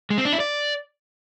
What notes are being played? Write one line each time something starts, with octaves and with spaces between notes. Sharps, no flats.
G#3
C4
D4
E4
D5